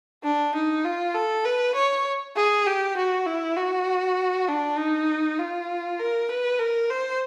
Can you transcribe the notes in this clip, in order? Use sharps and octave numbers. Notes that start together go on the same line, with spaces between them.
D4
D#4
F4
A4
B4
C#5
G#4
G4
F#4
E4
F#4
D4
D#4
F4
A#4
B4
A#4
C5